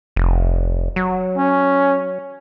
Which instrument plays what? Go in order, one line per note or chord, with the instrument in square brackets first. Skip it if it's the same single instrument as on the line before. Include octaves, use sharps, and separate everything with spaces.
[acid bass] F1
F#3
[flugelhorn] C#4